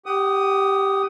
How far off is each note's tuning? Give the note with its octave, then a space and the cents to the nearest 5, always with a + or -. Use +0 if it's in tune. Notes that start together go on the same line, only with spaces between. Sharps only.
G4 +0 F#5 +35 D#6 +0